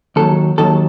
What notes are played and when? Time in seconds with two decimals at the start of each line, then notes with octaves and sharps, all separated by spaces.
0.16 D#2 D#3 F#3 A4
0.58 D#2 D#3 F#3 A4